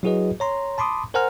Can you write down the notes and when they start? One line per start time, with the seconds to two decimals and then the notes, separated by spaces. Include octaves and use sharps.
0.03 F#3 E4 F#4 G#4 B4 D#5
0.40 C#5 A#5 C6
0.78 A5 B5 C6 D6 D#6
1.14 A#4 C5 F#5 G#5 A#5 F6